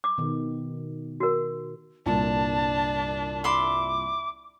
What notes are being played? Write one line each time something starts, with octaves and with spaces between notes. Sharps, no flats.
D6
B2 D#3
F#4 A#4
C2 G2 A#2 D4 A5
E5 B5 C6 D6